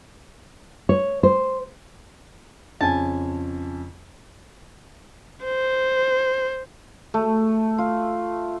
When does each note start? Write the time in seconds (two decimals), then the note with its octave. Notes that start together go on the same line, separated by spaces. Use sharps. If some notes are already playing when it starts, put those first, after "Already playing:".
0.89 C#5
1.23 C5
2.81 F2 C#3 C#4 G#5 A5
5.45 C5
7.14 A3
7.78 F4